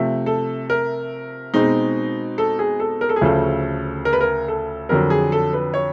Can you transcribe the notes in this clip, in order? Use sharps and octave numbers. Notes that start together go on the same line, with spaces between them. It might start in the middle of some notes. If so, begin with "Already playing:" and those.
Already playing: C3 F3 A3
A4
A#4
B2 G#3 C4 D#4
A4
G#4
A4
A#4
A4
G#4
D2 C#3 F3 A4
A#4
B4
A#4
A4
F2 D3 F#3 A#4
G#4
A4
B4
C#5